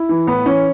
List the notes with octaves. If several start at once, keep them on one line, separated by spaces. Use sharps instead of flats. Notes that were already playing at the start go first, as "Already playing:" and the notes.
Already playing: E4
E3
A2 B3
E3 C#4